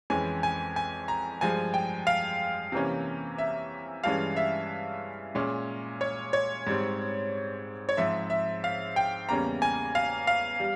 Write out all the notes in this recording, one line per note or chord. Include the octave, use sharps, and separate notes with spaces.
F2 E3 G#3 C#4 G#5
G#5
G#5
A#5
G2 F3 G#3 G#5
G5
F5
C3 E3 A#3 C#4
E5
G2 E3 G#3 C#4 F5
E5
A#2 G#3 C#4
C#5
C#5
G#2 G3 C4
C#5
G#2 F3 C4 E5
E5
F5
G5
E2 C#3 G3 A#3 C#4 A#5
G#5
F5
F5
G3